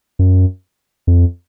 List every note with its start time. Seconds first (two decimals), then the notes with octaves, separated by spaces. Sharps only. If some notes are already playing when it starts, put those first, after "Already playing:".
0.19 F#2
1.07 F2